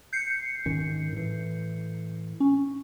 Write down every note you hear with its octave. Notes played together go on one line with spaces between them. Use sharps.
G6 C7 C#7
G#2 D#3 C#4
A2 E3
C#4